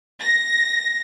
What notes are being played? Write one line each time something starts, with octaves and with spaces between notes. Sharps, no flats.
A#6